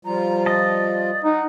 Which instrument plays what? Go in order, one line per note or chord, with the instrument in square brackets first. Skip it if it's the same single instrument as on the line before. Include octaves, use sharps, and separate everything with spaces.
[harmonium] F3 G3 F4 [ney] A#5
[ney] D5 [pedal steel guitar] D#5 A5
[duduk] D#4 [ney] F#5